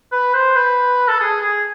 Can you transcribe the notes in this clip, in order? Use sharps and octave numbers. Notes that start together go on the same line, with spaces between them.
B4
C5
B4
A4
G#4
G#4